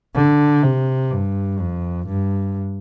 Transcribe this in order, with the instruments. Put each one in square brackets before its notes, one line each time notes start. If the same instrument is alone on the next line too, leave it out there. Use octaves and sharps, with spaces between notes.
[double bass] D3
C3
G2
F2
G2